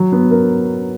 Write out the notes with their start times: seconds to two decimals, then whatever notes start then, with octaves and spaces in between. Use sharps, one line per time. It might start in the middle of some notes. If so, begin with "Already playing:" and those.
Already playing: F#3
0.12 B3
0.31 A#4